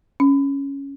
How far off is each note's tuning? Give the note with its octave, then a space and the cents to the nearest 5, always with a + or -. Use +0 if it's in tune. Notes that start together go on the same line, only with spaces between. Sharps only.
C#4 +0